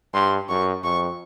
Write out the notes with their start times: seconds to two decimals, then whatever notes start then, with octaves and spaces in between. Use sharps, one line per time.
0.13 G2 C6
0.49 F#2 C#6
0.83 F2 C#6